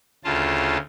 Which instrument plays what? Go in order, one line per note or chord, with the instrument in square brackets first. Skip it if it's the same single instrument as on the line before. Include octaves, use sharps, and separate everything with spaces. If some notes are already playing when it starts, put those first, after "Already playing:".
[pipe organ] D2 C#3 F4 A5